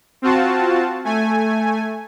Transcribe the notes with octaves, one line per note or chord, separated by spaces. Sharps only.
C4 F4 F#4 A5
A3 G#5